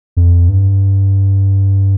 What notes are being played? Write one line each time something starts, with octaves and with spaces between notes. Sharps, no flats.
F2
G2